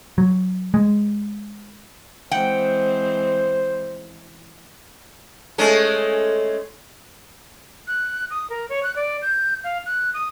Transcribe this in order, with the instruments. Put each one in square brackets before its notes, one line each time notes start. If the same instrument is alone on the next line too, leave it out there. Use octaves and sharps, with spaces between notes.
[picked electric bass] F#3
G#3
[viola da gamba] E3 G#3 C4 [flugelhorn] C5 [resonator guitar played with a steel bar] F#5 G5
[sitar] G#3 A3 C#4
[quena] F#6
D#6
A#4
C#5
F#6
D5
G6
F5
F#6
D#6